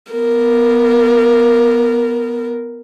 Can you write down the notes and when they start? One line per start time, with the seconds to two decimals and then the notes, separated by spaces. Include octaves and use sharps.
0.12 B3 A#4